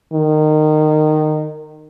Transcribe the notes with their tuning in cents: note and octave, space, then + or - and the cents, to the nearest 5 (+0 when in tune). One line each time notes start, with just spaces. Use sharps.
D#3 -20